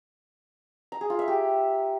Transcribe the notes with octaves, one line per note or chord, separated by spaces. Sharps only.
A#5
G#4
F4
E5
G4